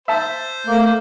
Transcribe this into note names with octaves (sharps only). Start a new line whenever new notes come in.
C5 E5 A5
A3 A#3